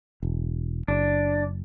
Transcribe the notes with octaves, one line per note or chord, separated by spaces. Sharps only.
E1
F#1 D4